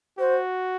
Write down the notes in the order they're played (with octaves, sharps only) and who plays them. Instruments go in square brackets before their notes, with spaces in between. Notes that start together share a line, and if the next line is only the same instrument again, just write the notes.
[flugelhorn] F#4 [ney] C5